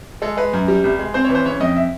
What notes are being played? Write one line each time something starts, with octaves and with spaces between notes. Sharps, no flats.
G#3 A4
G#3 B4
F#2
G3
C2
G#3
C4 C5
C#5
E3
C5
C#3 C#5
F2 D#5
E5